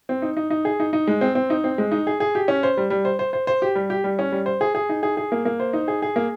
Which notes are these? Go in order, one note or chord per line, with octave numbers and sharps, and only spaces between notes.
C4
D#4
D#4
D#4
G#4
D#4
D#4
G#3
C4
C4
D#4
C4
G#3
D#4
G#4
G#4
G4
C#4
C5
G3
G3
C5
C5
C5
C5
G4
G3
G4
G3
C#4
G3
C5
G#4
G#4
D#4
G#4
G#4
A#3
A#3
C5
D#4
G#4
G#4
A#3